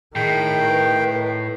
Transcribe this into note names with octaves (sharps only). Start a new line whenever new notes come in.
A2 D#3 G#4 G5
B4